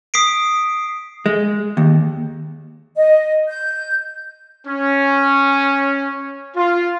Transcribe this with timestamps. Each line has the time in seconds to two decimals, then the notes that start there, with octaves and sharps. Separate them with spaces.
0.14 D#6 B6 C7 D7
1.26 G#3
1.77 D#2
2.97 D#5
3.49 G6
4.66 C#4
6.56 F4